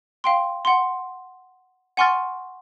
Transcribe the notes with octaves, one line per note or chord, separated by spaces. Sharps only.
F5 G5 C6
F#5 C6
F#5 G#5 C6 C#6 F6 A6